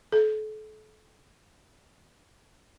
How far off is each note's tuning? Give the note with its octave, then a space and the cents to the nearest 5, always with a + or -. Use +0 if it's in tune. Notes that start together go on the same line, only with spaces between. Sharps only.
A4 -35